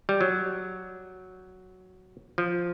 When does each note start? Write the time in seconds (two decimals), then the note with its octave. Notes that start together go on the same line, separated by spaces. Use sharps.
0.09 G3
0.21 F#3
2.38 F3